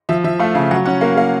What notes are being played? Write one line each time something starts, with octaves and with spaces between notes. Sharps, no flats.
F3 E5
F3 E5
A3 F5
C#3 F5
F#3 F#5
C#4 F#5
A#3 F5
A#3 F5